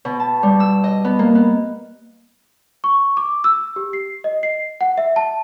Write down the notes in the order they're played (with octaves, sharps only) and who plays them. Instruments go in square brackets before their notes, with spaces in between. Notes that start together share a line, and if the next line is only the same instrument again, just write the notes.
[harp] B2
A5
G3
E6
D#5
B3
A#3
B3
[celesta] C#6
D6
E6
G4
C7
D#5
C7
F#5
E5
A5